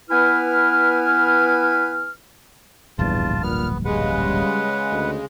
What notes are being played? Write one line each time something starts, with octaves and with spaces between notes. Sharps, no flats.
B3 E4 B4 G#5 F6
D1 A#1 E2 G2 F4 A5
A#2 B3 F6
C#3 G3 G#3 B4 F#5
D2